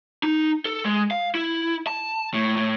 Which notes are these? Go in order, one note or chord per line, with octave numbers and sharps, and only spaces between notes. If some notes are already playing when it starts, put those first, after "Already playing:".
D#4
A4
G#3
F5
E4
A5
A2
A2